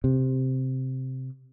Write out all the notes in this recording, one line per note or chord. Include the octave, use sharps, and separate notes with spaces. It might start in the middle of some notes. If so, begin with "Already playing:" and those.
C3